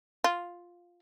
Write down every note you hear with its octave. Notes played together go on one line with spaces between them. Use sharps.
F4